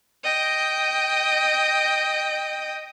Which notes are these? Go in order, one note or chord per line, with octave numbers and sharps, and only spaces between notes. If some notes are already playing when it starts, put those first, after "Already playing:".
D#5 G5